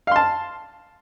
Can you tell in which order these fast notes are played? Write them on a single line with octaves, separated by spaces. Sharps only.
F5 C6 A5